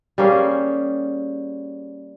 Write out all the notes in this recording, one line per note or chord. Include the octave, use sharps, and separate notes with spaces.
G3 A#3 C#4 G#4